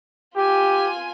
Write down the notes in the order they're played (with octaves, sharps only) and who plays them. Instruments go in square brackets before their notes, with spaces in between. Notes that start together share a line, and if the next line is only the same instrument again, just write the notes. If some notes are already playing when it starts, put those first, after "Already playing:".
[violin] F4 G#5 [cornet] G4